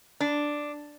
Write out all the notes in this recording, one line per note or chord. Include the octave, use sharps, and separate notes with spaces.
D4